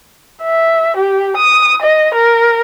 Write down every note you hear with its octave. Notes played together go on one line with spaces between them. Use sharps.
E5
G4
D#6
D#5
A#4